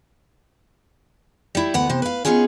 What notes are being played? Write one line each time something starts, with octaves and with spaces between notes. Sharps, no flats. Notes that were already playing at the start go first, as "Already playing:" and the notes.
G3 E4
D2 B3 F#5
C3 C5
B4 F5
B3 C#4 D#4 F4 G#4